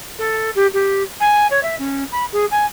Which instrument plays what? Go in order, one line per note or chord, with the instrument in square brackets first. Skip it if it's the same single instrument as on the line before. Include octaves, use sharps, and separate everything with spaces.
[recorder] A4
G4
G4
G#5
C#5
E5
C#4
B5
G#4
G#5